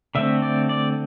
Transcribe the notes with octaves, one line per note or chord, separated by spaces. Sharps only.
D3 A3 C4 E5
D5
D5